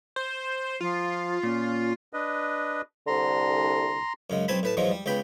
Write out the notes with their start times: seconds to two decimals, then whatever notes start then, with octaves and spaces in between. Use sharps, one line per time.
0.16 C5
0.80 F3 F4
1.43 A#2 C#4
2.13 D4 B4 D#5
3.07 C2 D3 A#5 C6
4.30 F#2 C#3 G#3
4.48 B1 C4 G#5 A5 B5
4.63 A2 B4 A5
4.77 E2 G#2 F3 F#3 G#3
4.91 G3
5.06 C#2 C#3 B3 G5 B5